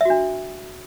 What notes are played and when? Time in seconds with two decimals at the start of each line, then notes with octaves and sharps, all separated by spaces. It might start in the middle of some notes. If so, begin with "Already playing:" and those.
0.01 E5
0.05 F#4
0.10 D4